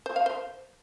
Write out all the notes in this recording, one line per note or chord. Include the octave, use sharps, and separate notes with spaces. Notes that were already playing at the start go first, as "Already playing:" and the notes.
C5
F5
C5